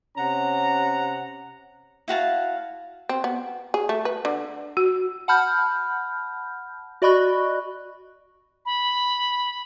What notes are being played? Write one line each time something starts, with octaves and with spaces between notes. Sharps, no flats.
C3 C#4 F#5 A#5
E4 F#4 F5 A5
C4
B3
G#4
A3
B4
D3
F#4
F#5 A5 B5 F6 G6
F#4 D5 D#5 B5 C#6 F#6
B5